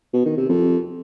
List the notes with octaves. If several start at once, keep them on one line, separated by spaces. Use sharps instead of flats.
B2
D#3
C3
F2